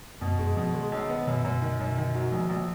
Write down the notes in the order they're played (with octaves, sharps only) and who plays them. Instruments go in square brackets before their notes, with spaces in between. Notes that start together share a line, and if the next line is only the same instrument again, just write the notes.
[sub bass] F#2 [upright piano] B2
[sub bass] F#2 [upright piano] G#3
[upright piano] B2 [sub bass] F3
[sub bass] D#3 [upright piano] G#3
[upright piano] B1
B3
[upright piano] F#2 [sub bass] B2
[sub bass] A#2
[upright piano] F#2 [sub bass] B2
[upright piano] D#3
[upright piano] F#2 [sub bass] B2
[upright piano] D#3
F#3
[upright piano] A#1 [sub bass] F3
[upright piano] A#1